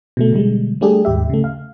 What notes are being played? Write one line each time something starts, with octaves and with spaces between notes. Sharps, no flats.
B2 D3 A3
B2 D3 G3 G#3
G3 A3 D4 G4 G#4
D#2 G#2 G4 E5
C#3 A3
F5